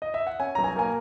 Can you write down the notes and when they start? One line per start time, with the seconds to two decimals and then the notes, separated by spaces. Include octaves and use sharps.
0.02 D#5
0.14 E5
0.27 F#5
0.40 C#4 G#5
0.55 B1 A#5
0.64 G#5
0.76 A#3 G#5